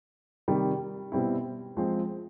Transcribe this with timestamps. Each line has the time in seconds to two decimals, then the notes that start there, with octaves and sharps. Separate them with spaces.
0.48 C3 D#3 G3
1.12 B2 G3 C4 E4
1.77 F3 G#3 C4